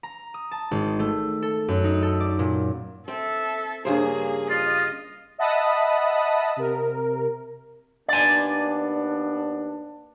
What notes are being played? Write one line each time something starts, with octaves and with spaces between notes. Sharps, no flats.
A#5
D#6
A5
G#1
A3
A4
F#2
D#4
A4
D5
A#2
C4 A4 E5
G2 C#3 A#3 G#4 C5
F4 D#5
D#5 E5 F#5 A5 B5 D#6
C3 A#4
D#2 B3 D4 D5 G#5